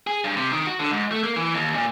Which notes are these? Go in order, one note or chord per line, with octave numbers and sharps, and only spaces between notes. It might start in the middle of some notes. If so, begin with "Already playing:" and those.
G#4
G2
C3
D#3
F#4
D3
G#2
A3
A#3
E3
D#2
A#2